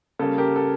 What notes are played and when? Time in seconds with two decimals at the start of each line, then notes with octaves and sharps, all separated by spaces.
0.19 C#3 G3 A#3 A4
0.38 G4 A#4
0.56 A4